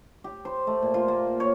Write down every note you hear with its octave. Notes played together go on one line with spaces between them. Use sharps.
G4
C5
A3
A#2
F4
A#3
C#5